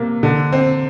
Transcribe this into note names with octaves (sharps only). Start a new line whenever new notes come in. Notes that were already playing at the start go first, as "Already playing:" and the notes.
Already playing: C3 A#3
D3
C4